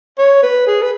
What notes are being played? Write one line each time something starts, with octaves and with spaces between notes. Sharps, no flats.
C#5
B4
G#4
B4